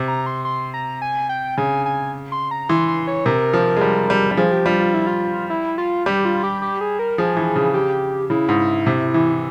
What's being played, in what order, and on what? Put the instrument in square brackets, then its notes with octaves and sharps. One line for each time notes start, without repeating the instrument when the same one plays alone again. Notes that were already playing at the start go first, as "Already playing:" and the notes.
Already playing: [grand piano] C3
[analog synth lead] A#5
C6
C6
A#5
G#5
G5
[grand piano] C#3 [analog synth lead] G#5
[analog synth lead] G#5
C6
A#5
[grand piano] E3 [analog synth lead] C6
[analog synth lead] C6
C#5
[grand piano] C3 [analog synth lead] A#4
[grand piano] F3
G#3
G3
G3
G3
[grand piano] F3 [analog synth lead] G#4
[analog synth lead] G4
[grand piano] G3 [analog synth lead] F4
[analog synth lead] F4
E4
F4
E4
F4
[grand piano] G3 [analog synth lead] G4
[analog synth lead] F4
G4
G4
G#4
A#4
[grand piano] F3 [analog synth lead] G#4
[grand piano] E3
C#3
[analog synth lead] G4
[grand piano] C#3 [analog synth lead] E4
[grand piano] G#2
C3
E3